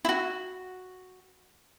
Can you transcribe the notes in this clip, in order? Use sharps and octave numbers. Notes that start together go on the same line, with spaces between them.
E4 F#4